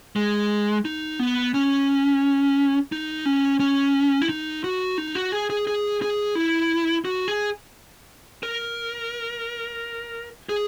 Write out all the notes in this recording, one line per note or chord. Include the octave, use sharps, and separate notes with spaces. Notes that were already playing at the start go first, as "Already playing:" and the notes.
G#3
D#4
B3
C#4
D#4
C#4
C#4
E4
D#4
F#4
D#4
F#4
G#4
G#4
G#4
G#4
E4
F#4
G#4
A#4
G#4